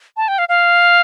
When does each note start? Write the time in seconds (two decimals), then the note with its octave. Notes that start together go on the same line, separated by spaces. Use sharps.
0.17 A5
0.28 G5
0.38 F5
0.49 F5